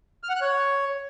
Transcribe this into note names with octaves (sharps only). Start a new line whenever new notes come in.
F6
F#5
F#6
C#5